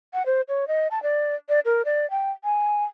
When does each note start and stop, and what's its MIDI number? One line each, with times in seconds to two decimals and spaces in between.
0.14 0.26 78
0.26 0.41 72
0.48 0.67 73
0.68 0.88 75
0.91 1.02 81
1.03 1.35 74
1.49 1.60 74
1.65 1.82 70
1.85 2.09 74
2.10 2.31 79
2.44 2.84 80